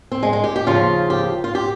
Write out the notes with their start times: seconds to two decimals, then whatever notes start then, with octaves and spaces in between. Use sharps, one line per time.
0.12 C4
0.23 G#3
0.33 G#3
0.44 G4
0.56 G4
0.66 D#2 C#3 F3 F4
1.10 G4
1.44 F4
1.55 G4